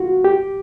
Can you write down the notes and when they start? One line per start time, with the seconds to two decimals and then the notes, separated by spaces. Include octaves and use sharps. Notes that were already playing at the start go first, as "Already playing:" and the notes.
Already playing: F4 F#4
0.24 G4